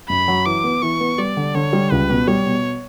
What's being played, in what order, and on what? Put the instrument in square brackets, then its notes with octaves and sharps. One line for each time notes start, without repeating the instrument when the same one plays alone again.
[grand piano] F#2 [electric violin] B5
[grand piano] F#3
[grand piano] E3 [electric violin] D6
[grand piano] B3
[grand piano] E3 [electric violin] C#6
[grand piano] B3
[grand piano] G3 [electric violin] D5
[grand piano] D3
[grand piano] D3 [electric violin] C#5
[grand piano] G3
[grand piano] C#2 [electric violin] B4
[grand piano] B2
[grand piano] G3 [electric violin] C#5
[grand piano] B2